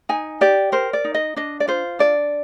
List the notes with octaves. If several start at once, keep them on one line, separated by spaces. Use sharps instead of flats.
D#4 G#5
G4 D5
A#4 C5
D5
D#4
D#5
D4 D#5
D5
F4 C5
D4 D5